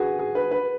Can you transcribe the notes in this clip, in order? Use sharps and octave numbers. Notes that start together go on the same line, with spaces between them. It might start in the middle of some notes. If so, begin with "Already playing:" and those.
Already playing: F#4 G#4 B4
G#4
B4
B4